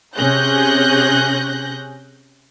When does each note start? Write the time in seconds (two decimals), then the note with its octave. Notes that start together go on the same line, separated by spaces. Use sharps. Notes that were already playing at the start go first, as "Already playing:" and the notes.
0.15 C3 C#4 G#4 F#6 G6 A#6